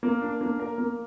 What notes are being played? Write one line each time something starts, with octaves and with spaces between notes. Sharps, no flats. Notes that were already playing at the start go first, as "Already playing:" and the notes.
A#3
D4
A#3
A#4
A#3